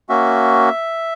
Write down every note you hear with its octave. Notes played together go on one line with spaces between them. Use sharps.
A#3 C#4 F#4 E5